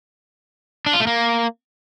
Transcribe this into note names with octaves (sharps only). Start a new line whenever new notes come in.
D4
F4
A3
A#3